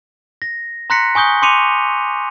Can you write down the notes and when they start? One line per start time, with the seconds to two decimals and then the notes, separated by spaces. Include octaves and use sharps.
0.42 A#6
0.90 A#5 C6 F#6 A#6 B6 C#7
1.15 G#5 C#6 D#6 G6 G7
1.42 C6 D6 C#7 D#7 F7